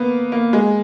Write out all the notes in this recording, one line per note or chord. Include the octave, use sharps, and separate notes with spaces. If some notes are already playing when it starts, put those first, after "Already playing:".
Already playing: A#3 B3
A#3
G#3